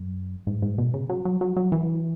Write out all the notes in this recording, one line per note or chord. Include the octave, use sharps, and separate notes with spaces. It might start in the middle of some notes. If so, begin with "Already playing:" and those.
Already playing: F#2
G#2
G#2
B2
C#3
F#3
F#3
F#3
F#3
E3